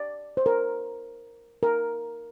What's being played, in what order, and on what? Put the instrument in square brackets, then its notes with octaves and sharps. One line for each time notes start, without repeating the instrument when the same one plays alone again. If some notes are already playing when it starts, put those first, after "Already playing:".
Already playing: [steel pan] D5
C5
A#4
A#4